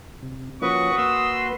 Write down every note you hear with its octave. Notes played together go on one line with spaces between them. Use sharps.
C3
F3 A#3 C#4 F#4 B4 C#6 D#6
A#3 C6 E6